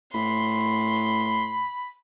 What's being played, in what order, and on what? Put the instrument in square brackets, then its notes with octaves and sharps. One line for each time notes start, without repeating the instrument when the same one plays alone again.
[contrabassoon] A2 [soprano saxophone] B5 [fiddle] C6